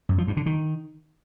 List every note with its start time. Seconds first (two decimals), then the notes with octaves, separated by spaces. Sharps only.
0.09 F#2
0.18 F3
0.28 G2
0.37 D3
0.46 D#3